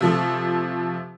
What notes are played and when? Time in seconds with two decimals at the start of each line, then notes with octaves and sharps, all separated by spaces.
0.01 C3 F3 A3